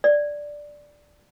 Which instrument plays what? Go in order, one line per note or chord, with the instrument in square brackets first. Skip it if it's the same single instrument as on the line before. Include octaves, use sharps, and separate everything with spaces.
[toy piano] D5